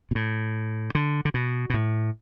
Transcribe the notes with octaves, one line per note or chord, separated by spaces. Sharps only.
B2
A2
D3
D3
B2
B2
A2